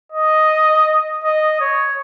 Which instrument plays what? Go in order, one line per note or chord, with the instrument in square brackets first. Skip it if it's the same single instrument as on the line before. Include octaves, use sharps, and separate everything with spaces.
[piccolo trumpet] D#5
D#5
C#5